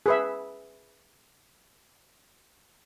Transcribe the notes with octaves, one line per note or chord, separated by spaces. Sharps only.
G#4 B4 E5